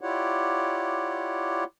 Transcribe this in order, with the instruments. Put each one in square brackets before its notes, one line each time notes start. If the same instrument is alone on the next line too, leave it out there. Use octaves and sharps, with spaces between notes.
[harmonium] E4 F4 G4 C#5 D5 F#5